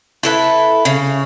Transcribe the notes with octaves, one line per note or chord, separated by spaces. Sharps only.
E4 A4 B4
C#3